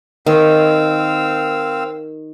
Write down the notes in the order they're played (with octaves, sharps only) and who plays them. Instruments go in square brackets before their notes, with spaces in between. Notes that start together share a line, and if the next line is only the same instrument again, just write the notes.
[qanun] D#3 [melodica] C4 F5 E6